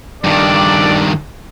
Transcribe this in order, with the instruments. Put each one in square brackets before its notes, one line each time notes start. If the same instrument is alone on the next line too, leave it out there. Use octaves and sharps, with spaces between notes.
[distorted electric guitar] G2 D#3 [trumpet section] D4 A4 D5